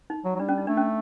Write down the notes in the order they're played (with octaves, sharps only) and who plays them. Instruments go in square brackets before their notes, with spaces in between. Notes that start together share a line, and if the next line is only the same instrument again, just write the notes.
[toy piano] D#4
[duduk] F#3
F#3
[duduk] G3 [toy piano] D4
[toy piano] C#4
D#4
[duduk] A3 [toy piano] D4
[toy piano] C#4